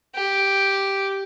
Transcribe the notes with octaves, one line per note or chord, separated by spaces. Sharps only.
G4